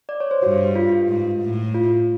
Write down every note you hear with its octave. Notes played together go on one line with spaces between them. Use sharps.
D5
C#5
C5
G2 F#4
F4
G#2
A2
F4